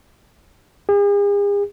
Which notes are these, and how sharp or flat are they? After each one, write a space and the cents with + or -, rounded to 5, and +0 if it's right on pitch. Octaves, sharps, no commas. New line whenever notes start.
G#4 -45